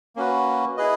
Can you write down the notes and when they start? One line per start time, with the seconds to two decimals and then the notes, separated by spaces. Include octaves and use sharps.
0.16 A#3 C#4 F#4 B4
0.77 E4 G#4 B4 D#5